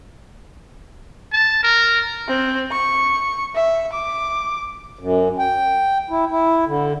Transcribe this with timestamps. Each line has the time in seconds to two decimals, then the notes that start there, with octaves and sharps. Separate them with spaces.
1.32 A5
1.63 A#4
2.28 C4
2.71 C#6
3.55 E5
3.93 D6
4.99 F#2
5.39 G5
6.10 E4
6.31 E4
6.67 D3